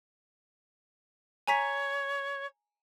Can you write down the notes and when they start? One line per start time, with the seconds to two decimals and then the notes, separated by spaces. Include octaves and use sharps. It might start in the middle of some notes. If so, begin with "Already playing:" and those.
1.47 C#5 G#5 A#5 B6